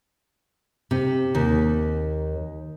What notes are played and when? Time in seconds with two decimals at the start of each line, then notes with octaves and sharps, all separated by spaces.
0.91 C3
1.35 D#2